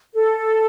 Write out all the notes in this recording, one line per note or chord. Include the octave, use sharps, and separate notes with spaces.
A4